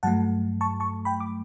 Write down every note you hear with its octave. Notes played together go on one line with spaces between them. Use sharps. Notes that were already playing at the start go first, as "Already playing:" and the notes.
G2 F#3 A3 F#5 A5
A5 C#6
A5 C#6
G5 B5
D6